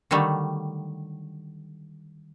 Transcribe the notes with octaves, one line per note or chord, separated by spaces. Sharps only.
D3 D#3 F#3 G3 A3